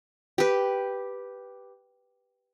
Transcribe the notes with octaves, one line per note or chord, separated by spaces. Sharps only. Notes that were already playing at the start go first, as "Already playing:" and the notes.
G4 B4